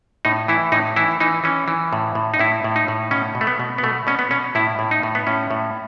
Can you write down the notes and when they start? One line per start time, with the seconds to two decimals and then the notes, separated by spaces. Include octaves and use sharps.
0.25 A2 D#4
0.48 E3 E4
0.72 A2 D#4
0.96 E3 E4
1.20 E3 D#4
1.44 E3 C#4
1.68 E3
1.93 A2
2.15 A2
2.34 D#4
2.39 A2 E4
2.64 A2
2.76 D#4
2.88 A2
3.11 B2 C#4
3.35 B2
3.41 A3
3.47 B3
3.60 B2
3.78 B3
3.83 B2 A3
4.07 B2 C#4
4.19 B3
4.31 B2 C#4
4.55 A2 E4
4.79 A2
4.91 D#4
5.03 A2
5.15 B3
5.27 A2 C#4
5.51 A2